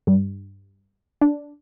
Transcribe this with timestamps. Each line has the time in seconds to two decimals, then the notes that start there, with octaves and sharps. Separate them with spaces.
0.07 G2
1.21 D4